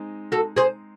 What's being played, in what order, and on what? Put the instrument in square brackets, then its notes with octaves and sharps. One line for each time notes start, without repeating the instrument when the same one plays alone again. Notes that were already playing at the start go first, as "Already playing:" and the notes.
Already playing: [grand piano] G#3 C4 D#4
[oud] F#4 A4
G#4 C5